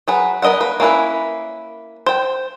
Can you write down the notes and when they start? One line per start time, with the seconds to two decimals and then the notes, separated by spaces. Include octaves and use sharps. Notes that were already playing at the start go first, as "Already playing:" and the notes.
0.08 F#3 G#4 B4
0.42 B3 A#4 D#5 E5 F#5
0.60 A#3 B4
0.80 A#3 C#4 E4 B4
2.06 C5 G5